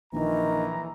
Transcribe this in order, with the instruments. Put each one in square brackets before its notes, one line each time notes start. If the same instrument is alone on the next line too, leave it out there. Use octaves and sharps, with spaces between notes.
[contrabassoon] A#1 [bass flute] D#3 [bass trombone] E3 [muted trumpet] A#5